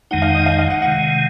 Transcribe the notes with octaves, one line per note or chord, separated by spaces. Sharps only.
F2 D#3 G#3 D#4 F#5
F5
D#5
F5
F5
F#5
C3 D#3 G#3 F#5